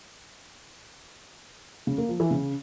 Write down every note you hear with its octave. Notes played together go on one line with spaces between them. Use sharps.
C#3
A#3
F3
E3
C#3